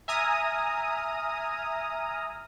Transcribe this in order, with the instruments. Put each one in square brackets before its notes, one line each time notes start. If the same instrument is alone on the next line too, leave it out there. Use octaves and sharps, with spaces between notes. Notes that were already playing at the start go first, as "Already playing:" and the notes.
[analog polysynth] E5 G#5 A#5 D#6 F6